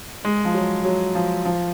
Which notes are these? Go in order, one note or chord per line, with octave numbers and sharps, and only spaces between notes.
G#3
F3
F#3
F#3
F3
F3